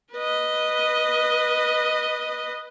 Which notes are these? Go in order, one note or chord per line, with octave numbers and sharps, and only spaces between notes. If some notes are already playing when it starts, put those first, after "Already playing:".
B4 D#5